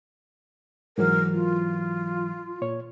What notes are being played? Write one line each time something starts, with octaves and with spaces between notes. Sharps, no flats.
G#2 E3 F#3 A#4
F4
A#2 C#5